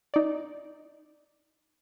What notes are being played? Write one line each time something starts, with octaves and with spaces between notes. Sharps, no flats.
D#4 D5